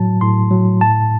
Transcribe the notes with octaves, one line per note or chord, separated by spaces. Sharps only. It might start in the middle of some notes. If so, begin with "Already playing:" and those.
Already playing: A2 F#3 A5
A2 C6
F#3
A2 A5